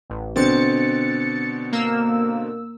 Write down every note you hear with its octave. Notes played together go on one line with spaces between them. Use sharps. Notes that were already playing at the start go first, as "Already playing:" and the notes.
A1
B2 D3 C4 A6 C#7
A#3 E6